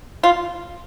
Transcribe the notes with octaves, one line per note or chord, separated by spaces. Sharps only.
F4